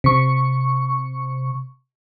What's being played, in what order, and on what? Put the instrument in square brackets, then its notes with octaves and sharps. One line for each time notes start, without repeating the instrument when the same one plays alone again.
[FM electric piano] C3 C#6